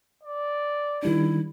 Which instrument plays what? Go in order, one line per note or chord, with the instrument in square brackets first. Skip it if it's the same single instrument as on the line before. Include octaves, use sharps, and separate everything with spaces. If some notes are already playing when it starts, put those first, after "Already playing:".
[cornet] D5
[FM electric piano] D#3 G3 D4 [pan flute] E4